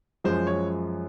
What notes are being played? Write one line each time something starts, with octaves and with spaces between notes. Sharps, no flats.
F#2 F3 G#3 C5
C#5